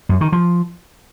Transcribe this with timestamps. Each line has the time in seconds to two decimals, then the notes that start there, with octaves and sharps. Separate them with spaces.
0.09 F#2
0.21 D#3
0.32 F3